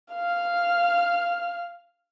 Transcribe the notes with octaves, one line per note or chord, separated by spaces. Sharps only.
F5 F6